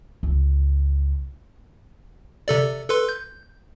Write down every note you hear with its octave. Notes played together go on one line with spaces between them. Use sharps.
C#2
C3 A4 D5
A4 B4 C6
G6